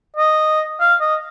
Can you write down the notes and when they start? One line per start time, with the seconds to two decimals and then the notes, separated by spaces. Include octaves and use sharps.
0.16 D#5
0.80 F5
1.01 D#5